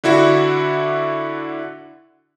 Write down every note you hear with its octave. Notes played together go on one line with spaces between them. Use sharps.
D3 D4 E4 F#4